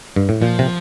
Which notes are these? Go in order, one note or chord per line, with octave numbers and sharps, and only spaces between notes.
G2
A2
A#2 F3
C3